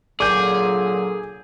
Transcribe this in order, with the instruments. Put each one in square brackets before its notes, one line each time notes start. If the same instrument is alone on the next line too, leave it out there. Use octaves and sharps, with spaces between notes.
[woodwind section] A#2 D3 F#3 [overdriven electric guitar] G#4 [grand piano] D6 G6